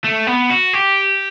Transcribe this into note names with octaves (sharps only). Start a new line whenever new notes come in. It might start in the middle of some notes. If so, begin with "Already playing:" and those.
A3
B3
F#4
G4